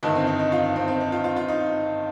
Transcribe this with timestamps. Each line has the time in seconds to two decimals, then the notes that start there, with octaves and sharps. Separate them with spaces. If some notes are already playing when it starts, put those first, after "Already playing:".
0.03 G1 G2 D#3 D#5
0.15 C4
0.27 D#4
0.39 D#4
0.52 F4
0.64 D#4
0.76 C4
0.88 C4
1.00 D#4
1.12 F4
1.24 F4
1.36 F4
1.49 D#4